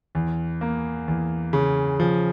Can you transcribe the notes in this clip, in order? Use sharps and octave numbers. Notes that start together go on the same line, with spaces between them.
E2
A#3
E2
C#3
F3